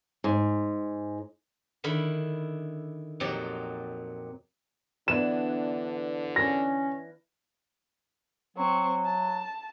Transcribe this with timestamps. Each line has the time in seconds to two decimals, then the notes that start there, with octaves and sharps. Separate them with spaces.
0.24 G#2
1.84 D3 D#3 E4 B5
3.20 F2 A#2 F#3 D#4 G4 D5
5.08 D3 E3 B3 D4 E7
6.36 C#4 A#6
8.57 F#3 C4 C#6
9.06 A5